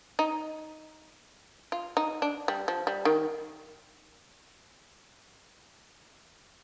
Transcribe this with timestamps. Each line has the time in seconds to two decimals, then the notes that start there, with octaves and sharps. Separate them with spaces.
0.19 D#4
1.72 F4
1.97 D#4
2.22 D4
2.48 G3
2.68 F3
2.87 G3
3.05 D#3